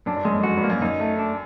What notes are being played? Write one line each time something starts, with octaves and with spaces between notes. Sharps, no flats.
F#2 D4
G2
F#2 G#3
F2
F#2 F#4
G2
A#3
F#2
F#2 D#4
A3
D4